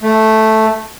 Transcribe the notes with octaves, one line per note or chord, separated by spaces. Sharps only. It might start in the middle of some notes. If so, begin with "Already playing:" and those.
A3